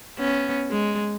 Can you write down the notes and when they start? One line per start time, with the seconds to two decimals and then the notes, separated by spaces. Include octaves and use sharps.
0.19 B3 C#4
0.71 G#3